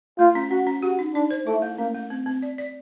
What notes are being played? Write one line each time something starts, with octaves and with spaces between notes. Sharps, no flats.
A3 F4
C#4
C#4 F#4
C#4
F#4 G4
D#4
D4 D#4
C5
A3 E4
A3
A#3 C#4
A3
C4
C4
D5
D5